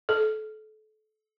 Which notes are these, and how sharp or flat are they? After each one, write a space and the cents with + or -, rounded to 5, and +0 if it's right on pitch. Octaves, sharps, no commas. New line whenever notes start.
A4 -30